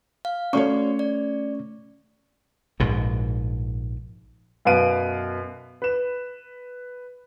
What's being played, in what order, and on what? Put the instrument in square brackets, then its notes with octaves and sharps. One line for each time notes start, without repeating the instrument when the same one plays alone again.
[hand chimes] F5
[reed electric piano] A3 C#4 [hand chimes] F#4 D5 [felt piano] C#5 C#6
[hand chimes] D5
[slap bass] A#1 G#2 B2
[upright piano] F#2 B2 B4 F5 D7 D#7
B4 E7